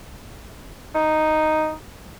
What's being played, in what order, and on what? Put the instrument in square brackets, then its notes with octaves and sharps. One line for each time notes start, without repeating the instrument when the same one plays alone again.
[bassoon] D#4